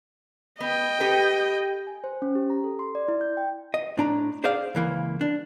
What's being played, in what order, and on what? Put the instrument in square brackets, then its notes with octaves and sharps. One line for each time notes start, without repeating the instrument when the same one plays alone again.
[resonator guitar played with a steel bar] B3 [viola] D#5 G5
[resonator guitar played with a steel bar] G4 A4 B4
[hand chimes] G#5
C5
C#4
G4
A#5
A4
C6
D5
E4
G6
G5
[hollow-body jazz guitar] D#5
A2 D4 A#5
G#4 C5 D5 D#5 F5
C#2 E3 A#3
D4